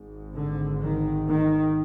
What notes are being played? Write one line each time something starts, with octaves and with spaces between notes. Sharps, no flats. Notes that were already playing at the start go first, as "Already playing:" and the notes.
Already playing: G#1 G#2
D3
D#3
D#3